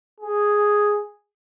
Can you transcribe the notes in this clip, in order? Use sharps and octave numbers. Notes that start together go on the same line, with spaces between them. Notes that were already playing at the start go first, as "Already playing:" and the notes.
G#4